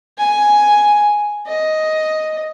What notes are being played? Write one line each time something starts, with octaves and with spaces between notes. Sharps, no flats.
G#5
D#5